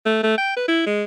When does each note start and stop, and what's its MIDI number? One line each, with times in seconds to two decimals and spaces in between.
0.06 0.21 57
0.23 0.37 57
0.37 0.53 79
0.56 0.67 71
0.68 0.83 64
0.86 1.04 56